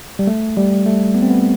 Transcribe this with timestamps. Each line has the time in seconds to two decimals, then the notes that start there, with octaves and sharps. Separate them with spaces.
0.19 G3
0.27 A3
0.57 G3
0.86 A3
1.15 B3
1.22 C4
1.30 B3